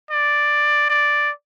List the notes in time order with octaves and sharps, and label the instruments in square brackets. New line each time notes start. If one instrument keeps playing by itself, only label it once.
[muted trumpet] D5
D5